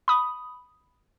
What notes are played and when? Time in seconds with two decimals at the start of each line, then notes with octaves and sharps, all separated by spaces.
0.08 B5 D#6